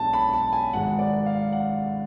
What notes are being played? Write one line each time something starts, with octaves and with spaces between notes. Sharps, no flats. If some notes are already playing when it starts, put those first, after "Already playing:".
Already playing: B1 B2 G#3 B3 D4 A5
B5
A5
G#5
G#1 G#2 G#3 F#5
D5
F5
F#5